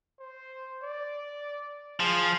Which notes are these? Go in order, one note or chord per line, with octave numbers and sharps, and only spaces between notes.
C5
D5
F3 G#4